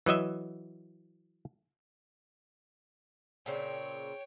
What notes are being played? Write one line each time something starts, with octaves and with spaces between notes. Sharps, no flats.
E3 F#3 D#5 E5
A#2 C#3 C4 C#5 G5